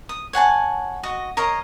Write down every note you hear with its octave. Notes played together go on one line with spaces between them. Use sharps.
D#6
C#5 F#5 G#5 A5
F#4 D#5
A#4 C#5 D#5 F5